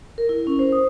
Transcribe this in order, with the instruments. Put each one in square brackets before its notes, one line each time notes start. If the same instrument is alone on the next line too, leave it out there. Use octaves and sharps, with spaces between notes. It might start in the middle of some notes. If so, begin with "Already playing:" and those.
[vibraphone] A#4
E4
C#4
C5
D#6